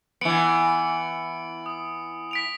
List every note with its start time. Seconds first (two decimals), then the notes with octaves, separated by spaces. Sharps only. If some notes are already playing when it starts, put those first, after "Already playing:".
0.21 E3 B3 C#7 D7 F#7
1.66 D#6
2.31 B6 D7 F7